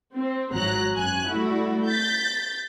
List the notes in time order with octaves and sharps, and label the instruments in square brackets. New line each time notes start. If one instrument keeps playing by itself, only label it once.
[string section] C4
G#1 F3 F#3 A#5 F#6
F#2 G#5 F#6
G3 A3 E4 F#4
G6 A6 B6